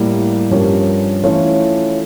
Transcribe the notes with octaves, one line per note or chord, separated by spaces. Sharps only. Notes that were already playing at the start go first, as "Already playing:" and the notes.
Already playing: A2 G3 A#3
G2 F3 C#4 G4 A#4
E3 A3 C#4 F4 C#5